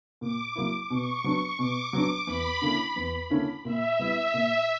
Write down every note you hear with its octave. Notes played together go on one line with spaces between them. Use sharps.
A#2 D6
F#3 A#3 E4
B2 C#6
F#3 B3 D4
B2 D6
F#3 B3 D4 D6
E2 B5
D3 A#3 C#4 E4
E2
D3 A#3 C#4 E4
A#2 E5
G3 B3 E4
A#2